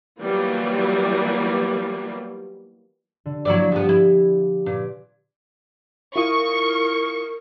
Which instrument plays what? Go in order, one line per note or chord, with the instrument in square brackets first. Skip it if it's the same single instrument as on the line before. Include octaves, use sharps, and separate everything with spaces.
[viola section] E3 F#3 G3 A#3 B3 F4
[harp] D3
[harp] F3 A#3 [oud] F#3 E4 D5
[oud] F3 B3 [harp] G4
[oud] E4
[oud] A#2 [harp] B4 D6
[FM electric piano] E4 F4 D#6 [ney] A#4 [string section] C#6